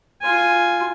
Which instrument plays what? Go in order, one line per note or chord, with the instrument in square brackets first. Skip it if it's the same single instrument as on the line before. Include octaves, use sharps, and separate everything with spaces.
[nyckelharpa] F4 G#5